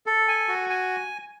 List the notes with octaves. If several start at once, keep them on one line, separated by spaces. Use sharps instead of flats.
A4
G#5
F#4
G#5